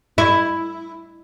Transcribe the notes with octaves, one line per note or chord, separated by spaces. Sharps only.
E4